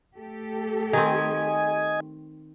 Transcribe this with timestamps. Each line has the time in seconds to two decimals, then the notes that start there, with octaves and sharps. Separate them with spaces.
0.17 A3 G4 A4
0.93 D#3 C4 D#5 G#5